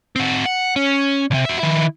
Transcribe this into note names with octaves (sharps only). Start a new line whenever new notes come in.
C4 F#4
F#5
C#4
C2 C3
F#4 E5
D#3 E4